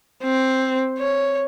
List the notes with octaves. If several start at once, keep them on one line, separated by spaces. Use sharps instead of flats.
C4
C#5